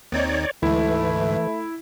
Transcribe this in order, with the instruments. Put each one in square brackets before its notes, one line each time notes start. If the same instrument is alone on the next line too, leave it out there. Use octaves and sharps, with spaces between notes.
[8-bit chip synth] D#2 C4 D#4 [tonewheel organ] C#5 D5
[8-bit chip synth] D2 G#2 [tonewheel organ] E3 [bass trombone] A3 [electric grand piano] E4